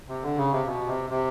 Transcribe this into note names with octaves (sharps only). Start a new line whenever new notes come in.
C3
D3
C#3
C3
B2
C3
C3